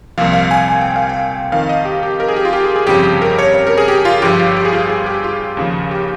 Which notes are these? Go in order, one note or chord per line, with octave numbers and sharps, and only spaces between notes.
C2 A#2 F3 F5
F5
G#5
G#5
G5
F5
G5
F2 D#3 F5
D#5
G4
G4
A#4
G#4
G4
F4
G4
G#4
G#4
G1 F2 C#3 F3 G4
A#4
C#5
C#5
A#4
G#4
G4
F4
G1 G2 F3 G4
F4
G4
G#4
F4
G#4
G4
F4
D#2 C#3 F3
G4